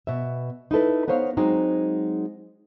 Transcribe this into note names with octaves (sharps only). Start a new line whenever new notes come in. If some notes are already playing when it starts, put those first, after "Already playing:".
B2 E5
D#4 E4 A4 B4
B3 D#4 C5 C#5 F5
F#3 G#3 C4 D#4 F#4